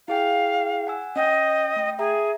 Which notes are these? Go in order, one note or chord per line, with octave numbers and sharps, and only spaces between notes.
E4 G#4 F5 G5
F#5 G#5 E6
C#4 D#5 G5 G6
A3 G5
G#4 E5 A#5